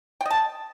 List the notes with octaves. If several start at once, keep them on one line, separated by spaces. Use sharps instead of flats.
D#5 G5 A5